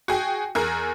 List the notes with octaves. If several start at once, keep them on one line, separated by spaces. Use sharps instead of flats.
F#4 G#4 G5
E2 G#4 A#4